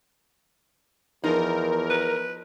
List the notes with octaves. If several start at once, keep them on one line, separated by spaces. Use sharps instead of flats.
E2 F3 D#4 A#4
B4